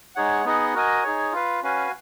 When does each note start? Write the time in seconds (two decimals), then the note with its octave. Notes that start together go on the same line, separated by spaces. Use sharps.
0.15 G#3 D#4 G#4 C#5 F#5
0.45 B3 D#4 G#4 D#5 F#5
0.74 F#4 A#4 D#5 G#5
1.04 D#4 G#4 C#5
1.32 F4 B4 F5
1.63 C#4 F#4 B4 F5 G#5